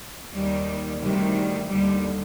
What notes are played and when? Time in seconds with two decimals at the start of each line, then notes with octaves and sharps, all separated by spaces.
0.33 D#2 D#3 G3
1.01 D2 C3 D#3 G3
1.68 D#2 D3 G3